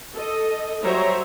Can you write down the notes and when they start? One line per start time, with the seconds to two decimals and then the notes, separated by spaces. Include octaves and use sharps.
0.15 A4 D#5
0.83 F#3 G3 C5 C#5 E5 A#5